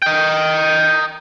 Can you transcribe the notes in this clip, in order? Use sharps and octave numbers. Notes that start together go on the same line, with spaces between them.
D#5 G5